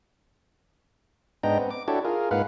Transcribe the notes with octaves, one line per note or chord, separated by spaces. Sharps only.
G#2 B3 D4 D#4 G5 A#5
B3 C4
D6
D4 E4 F#4 G4 A4 C#5
F4 G#4 A#4
G#2 A#3 B4 F5 F#5